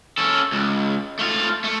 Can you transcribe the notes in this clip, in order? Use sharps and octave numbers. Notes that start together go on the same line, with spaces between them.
C#4 A4
C#2
A3 F4
A3